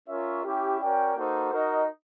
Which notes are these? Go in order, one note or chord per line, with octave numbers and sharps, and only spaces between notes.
C#4 F4 A#4 C#5 E5
C#4 E4 G4
C#4 F#4 A#4 D5 G5
A#3 D#4 F#4 A4 C5
D#4 F#4 A#4 D#5